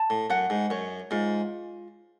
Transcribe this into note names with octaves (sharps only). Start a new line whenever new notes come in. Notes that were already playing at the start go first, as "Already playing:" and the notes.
Already playing: A5
A2
F#2 F#5
G#2
F#2 C#5
G#2 F4